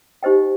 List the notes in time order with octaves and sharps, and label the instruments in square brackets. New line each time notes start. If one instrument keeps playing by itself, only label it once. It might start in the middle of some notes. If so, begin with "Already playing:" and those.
[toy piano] D#4 G4 C5 D#5 G5